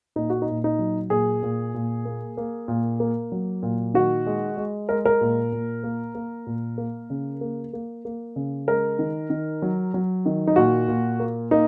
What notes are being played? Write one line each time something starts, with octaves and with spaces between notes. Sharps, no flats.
A#2 D#4
F#4
D#4
A#2
D#4
F#3
A#2 G#4
A#2
A#2
A#3
A#3
A#2
A#3
F#3
A#2
D#3 F#4
G#3
G#3
G#3 A#4
A#4
A#2
A#2
A#3
A#3
A#2
A#3
C#3
A#3
A#3
A#3
C#3
G#3 A#4
D#3
D#3
F#3
F#3
D#3
D#4
A#2 F#4
A#2
A#3
A#3 D#4